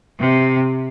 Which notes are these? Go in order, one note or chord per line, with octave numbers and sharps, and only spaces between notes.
C3